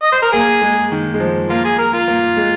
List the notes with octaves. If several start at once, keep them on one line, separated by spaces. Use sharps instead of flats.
D#5
C5
A#4
A#3 G#4
G#3
D#3
G#3
F3
A#3 F4
G#4
A#4
F4
A#3
G#3